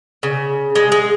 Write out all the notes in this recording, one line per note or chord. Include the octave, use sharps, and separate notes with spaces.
C#3
G#3
G#3